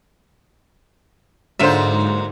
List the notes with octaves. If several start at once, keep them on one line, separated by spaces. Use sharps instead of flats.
G#2 D3 F#3 A#3 F4 C5 E5